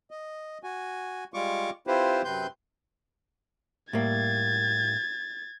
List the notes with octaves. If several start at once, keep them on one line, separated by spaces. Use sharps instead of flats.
D#5
F#4 G#5
G3 G#3 F4 C#6 D6
C4 E4 F4 G4 B4 C5
F#2 C3 C4 B4 C6 G6
A2 G3 A#3 G#6 A6